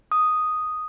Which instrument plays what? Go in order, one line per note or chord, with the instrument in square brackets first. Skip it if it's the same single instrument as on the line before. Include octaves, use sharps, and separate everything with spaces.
[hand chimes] D#6